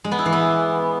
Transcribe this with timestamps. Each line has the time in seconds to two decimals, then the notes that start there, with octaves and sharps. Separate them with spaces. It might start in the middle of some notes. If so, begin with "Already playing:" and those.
0.04 G#3
0.12 B3
0.19 E4
0.26 E3
0.33 B3